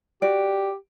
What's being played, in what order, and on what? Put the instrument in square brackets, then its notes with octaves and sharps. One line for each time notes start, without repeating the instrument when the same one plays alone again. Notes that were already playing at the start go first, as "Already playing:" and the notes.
[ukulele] F#4 D5 [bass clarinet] G4